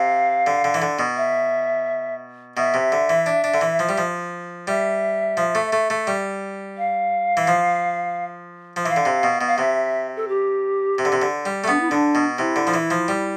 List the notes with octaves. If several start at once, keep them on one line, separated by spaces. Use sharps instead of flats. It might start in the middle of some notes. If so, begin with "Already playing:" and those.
Already playing: C3 F5
D3
D3
E3
D3
B2
E5
B2 E5
C3
D3
E3
D4
D4
D3
E3
F3
G3
F3
G3 E5
F3
A3
A3
A3
G3
F5
E3
F3
F3
E3 E5 F5
D3
C3
B2
B2
F5
C3 E5
A4
G4
C3
D3
C3
D3
G3
A3
B3 D4
E4
D3 D4
B2
C3 E4
D3
F3
E3
F3
G3